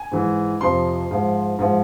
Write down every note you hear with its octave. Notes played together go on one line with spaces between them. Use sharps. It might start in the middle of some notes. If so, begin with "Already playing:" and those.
Already playing: G#5
G#2 E3
F2 C3 F3 C6
G#2 F3
G#2 F3